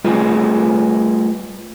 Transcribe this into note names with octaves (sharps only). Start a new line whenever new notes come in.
G3 A3 F4 G#4 B4 D#5